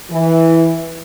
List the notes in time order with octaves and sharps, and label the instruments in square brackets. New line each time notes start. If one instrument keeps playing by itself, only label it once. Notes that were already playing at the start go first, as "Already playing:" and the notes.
[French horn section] E3